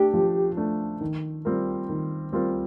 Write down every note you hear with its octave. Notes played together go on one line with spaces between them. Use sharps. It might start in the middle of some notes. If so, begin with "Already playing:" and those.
Already playing: A3 D4 G4
F3
A3 D4
D#3
G3 C4 F4 A#4
D#3
G3 C4 F4 A#4